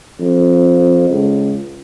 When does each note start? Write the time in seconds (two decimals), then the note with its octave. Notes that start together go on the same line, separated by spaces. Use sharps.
0.21 F2
1.10 C#2